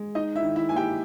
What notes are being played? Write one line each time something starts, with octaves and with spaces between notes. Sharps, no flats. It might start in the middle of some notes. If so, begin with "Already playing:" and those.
Already playing: G#3
D#4 D#5
E4 E5
D#3
E4 E5
A#3 G#5
G4 G5